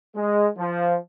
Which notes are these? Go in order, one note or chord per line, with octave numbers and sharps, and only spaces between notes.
G#3
F3